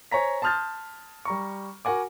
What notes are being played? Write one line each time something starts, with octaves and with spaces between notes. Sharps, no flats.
C5 C#5 G#5 A#5 B6
A5 C6 D#6 F6 G6 A6
G3 A#5 C#6
F#4 A#4 F#5 G#5 D6